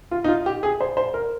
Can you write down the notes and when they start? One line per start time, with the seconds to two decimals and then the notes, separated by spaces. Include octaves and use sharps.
0.11 F4
0.24 D#4
0.28 F4
0.46 G4
0.63 G#4
0.81 C5
0.97 C5
1.14 A#4